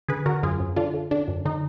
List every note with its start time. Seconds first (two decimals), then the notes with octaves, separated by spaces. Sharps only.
0.09 D3 G#4 B4
0.26 D3 F#4 A#4
0.43 F#2 F4 G#4
0.60 F#2
0.76 D3 D4 F4
0.94 D3
1.11 D3 D4
1.28 F#2
1.45 D3 D#4